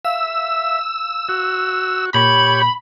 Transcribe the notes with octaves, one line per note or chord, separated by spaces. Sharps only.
E5 F5 E6
F#4
A#2 G4 C#5 B5